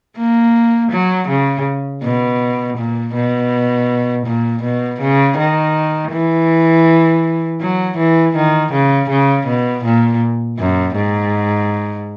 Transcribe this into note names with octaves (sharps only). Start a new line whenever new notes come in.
A#3
F#3
C#3
B2
A#2
B2
A#2
B2
C#3
D#3
E3
F#3
E3
D#3
C#3
C#3
B2
A#2
F#2
G#2